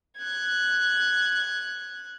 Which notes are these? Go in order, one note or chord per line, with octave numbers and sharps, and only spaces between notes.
F#6 G#6